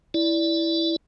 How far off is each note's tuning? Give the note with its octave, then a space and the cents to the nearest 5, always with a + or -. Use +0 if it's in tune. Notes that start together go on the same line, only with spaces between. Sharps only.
E4 +0 D5 -5